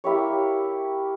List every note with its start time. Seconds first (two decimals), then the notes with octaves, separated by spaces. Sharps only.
0.04 A#3 E4 G4 C#5